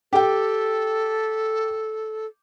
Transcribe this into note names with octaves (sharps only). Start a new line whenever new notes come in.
G4 A4 G5